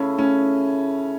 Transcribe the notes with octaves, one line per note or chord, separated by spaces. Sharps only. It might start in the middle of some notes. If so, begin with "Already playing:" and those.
Already playing: C#3 A3 C#4 E4 C#5
C#4